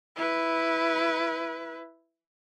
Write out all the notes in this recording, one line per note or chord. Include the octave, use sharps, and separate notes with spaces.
E4 B4